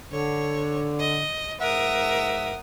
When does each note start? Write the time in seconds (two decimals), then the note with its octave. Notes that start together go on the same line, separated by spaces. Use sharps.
0.12 D3 C#5
0.99 D#5
1.61 G#2 A#4 E5 F#5 D#6